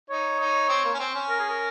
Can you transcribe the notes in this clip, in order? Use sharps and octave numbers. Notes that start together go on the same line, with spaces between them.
D#4 C#5
D#4
C4
A#3
C#4
C4
C#4
A#4
G#4
A#4